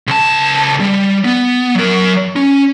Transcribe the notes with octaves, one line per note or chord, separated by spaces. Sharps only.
C#2 A5
G3
B3
F#3 A#4
C#4